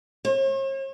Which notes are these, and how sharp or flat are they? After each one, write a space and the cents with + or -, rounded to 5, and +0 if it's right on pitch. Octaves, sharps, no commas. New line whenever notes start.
C#5 -45